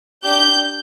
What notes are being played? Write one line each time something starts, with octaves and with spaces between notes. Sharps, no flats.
D4 G4 G6